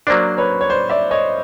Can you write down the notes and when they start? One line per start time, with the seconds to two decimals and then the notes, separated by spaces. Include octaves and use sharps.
0.07 F#3 A#3 D4 C5 D5
0.38 B4 C#5
0.61 C#5
0.69 C5 D5
0.89 D5 E5
1.11 C#5 D#5